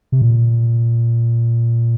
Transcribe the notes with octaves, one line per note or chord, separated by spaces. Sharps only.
C3
A#2